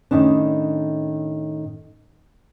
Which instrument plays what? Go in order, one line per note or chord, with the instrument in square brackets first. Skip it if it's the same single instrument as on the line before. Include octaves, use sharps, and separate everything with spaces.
[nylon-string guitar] A2 D#3 C#4 D4